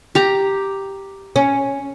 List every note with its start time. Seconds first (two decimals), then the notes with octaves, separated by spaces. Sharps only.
0.15 G4 A#5
1.36 C#4